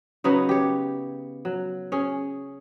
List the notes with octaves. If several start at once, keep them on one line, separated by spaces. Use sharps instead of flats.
C#3 F#3 B3 D#4
G4 C#5
F#3
C#4 G#4